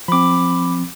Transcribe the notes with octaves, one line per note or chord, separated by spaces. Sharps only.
F3 C4 B5 D6